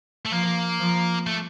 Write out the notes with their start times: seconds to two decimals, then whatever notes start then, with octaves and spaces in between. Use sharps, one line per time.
0.25 A3
0.31 F3 A#3
0.80 F3
1.27 A3